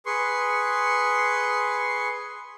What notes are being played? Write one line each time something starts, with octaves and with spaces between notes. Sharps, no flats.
G#4 B4 C6 C#6